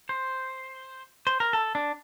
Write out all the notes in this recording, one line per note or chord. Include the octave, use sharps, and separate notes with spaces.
C5
C5
A#4
A4
D4